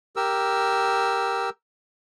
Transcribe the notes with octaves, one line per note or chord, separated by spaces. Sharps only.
G4 A#4 E6